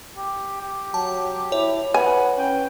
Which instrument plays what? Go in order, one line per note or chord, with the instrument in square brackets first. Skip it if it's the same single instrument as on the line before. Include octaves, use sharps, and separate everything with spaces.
[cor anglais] G4
G4
[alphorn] F#3 [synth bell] A5
[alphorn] E4 [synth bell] C#5
[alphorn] B4 [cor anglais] F#5 [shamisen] G#5
[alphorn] C#4 [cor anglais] G5